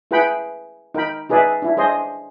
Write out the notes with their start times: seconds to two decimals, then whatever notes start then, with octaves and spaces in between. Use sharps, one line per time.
0.11 E4 G#4 B4 F#5 G5 B5
0.94 D#4 A#4 G5 B5
1.29 D#4 G#4 B4 D5 E5
1.62 D4 E4
1.77 D4 G#4 C5 D#5 C6